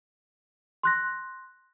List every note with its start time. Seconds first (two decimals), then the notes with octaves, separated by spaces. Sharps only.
0.83 C6 F#6 A#6